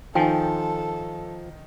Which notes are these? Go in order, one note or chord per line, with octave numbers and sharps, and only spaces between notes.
D#3 F3 D#4 A4 G5 G#5